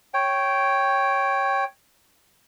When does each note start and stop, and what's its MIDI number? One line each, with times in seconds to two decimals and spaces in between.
0.14 1.64 73
0.14 1.64 79